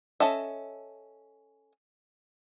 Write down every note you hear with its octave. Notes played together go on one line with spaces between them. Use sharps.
C#4 A4 D#5 E5